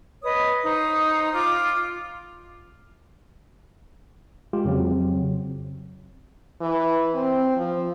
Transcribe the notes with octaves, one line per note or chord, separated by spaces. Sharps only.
B4 C#5 D#5 D#6
D#4 C5
F4 D6
G#3 F4 G4
F2 C#3 F#3 C4
E3
C4
F3